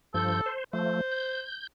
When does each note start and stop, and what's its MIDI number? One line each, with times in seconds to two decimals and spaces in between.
0.14 0.41 43
0.14 0.41 53
0.14 0.51 69
0.14 0.41 91
0.46 0.64 72
0.73 1.01 53
0.73 1.01 57
0.73 1.43 72
1.12 1.67 91